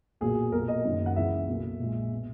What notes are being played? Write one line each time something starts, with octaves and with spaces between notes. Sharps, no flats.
B1 A#2 F#3 A#3 G#4
B1 A#2 A#3 A#4
D#5
F#1 F#2 D#3 F#3 A#3
F#5
C#2 C#3 E3 E5
B1 B2 F#3 A#3
A#1 A#2 G#3
B2